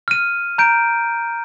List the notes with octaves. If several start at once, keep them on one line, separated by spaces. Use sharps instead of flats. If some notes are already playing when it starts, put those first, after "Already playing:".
F6 D#7
A#5 G6 D7